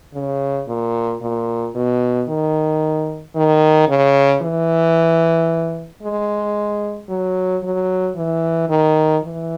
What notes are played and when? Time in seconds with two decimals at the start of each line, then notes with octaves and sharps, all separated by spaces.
0.14 C#3
0.68 A#2
1.21 A#2
1.75 B2
2.28 D#3
3.35 D#3
3.88 C#3
4.42 E3
6.03 G#3
7.09 F#3
7.63 F#3
8.16 E3
8.69 D#3
9.24 E3